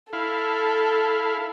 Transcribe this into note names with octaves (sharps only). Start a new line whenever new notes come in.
E4 A4 F5